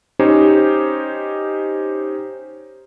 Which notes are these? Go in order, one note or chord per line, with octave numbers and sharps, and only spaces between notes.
C#4 D#4 G4 C5 C#5